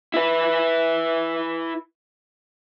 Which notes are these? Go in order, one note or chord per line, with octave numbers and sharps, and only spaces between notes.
E4 B4